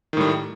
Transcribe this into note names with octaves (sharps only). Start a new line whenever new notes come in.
A2 D#3 G3